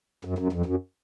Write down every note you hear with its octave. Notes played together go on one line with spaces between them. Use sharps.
F#2
F#2
F2
F#2